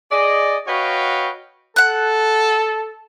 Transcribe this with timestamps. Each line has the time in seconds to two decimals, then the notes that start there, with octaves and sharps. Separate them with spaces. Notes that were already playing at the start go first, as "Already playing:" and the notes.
0.11 G#4 D5 D#5
0.67 F#4 B4 C#5 D#5 F5 G5
1.76 A4 F#5 F#6